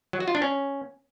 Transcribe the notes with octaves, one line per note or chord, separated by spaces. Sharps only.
F#3
F#4
F4
D4
C#4